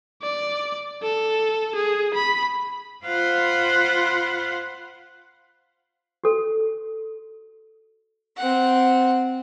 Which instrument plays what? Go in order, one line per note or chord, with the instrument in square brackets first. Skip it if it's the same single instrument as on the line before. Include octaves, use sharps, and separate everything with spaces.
[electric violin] D5
A4
G#4
B5
[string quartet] F4 C5 F5 F#5 B5 C6
[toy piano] F#4 A4
[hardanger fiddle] C4 F#5